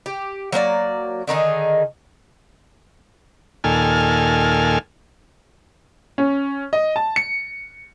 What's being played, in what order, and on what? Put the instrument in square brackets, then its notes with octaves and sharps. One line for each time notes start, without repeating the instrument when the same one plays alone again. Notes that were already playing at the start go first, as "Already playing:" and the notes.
[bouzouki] G4
F#3 A#3 C5 D5
D3 D#3 D#4 G#4
[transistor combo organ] D#2 A#2 A4 G#5 F6
[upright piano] C#4
D#5
A5
C#7